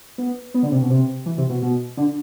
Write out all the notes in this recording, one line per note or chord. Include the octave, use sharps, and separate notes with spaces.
B3
B3
D3
C3
B2
C3
E3
C3
B2
B2
D3